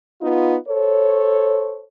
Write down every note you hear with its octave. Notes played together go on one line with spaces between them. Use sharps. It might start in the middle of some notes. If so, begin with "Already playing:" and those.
B3 D#4 F4
A4 C5 C#5